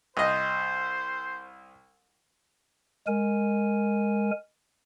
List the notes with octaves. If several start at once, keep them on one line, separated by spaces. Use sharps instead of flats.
C2 C5 D#5
G#3 A#4 G#5